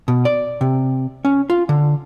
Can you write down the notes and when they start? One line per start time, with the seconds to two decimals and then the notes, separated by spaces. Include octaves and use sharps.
0.08 B2
0.25 D5
0.61 C3
1.25 C#4
1.50 F4
1.69 D3